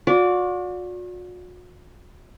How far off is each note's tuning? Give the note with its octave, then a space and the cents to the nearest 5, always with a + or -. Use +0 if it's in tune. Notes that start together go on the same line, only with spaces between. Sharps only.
F#4 -45 D5 -20